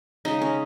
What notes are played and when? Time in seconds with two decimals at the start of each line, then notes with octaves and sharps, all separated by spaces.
0.25 C#3 G#3 D#4
0.42 C#4